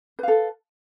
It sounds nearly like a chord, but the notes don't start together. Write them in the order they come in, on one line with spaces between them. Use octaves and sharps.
B4 F5 A4